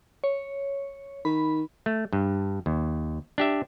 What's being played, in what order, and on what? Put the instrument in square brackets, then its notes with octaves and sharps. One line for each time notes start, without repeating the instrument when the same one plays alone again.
[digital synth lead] C#5
[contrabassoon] D#3 [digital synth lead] B5
[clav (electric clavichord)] A3
G2
D#2
D4 G4 E5